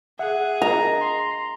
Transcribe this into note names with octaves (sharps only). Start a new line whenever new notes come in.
G#4 E5 F#5
D#5 A#5
C6